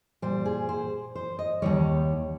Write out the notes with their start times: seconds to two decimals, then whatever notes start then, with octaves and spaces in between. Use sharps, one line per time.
0.22 A#2 G3 C5
0.45 G#4
0.69 C5
1.15 C5
1.39 D#5
1.62 D#2 D#3 G3 C#5